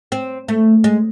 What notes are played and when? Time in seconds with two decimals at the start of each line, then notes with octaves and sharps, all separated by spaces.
0.12 C4
0.48 A3
0.84 G#3